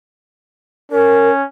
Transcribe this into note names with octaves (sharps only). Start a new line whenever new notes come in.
C#4 A#4